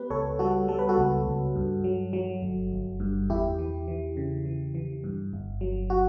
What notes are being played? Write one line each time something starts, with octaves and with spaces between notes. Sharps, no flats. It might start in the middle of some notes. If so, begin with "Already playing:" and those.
Already playing: B3 G4 B4
C#2 A4 C#5
G3 F#4 A4
G3 A4
B4
F#4 A4
C#2
C#2
G2
F#3
F#3
G1
G1
G2
E2 E4 G4
E3
E3
C#3
E3
E3
G2
G1
F#3
F#4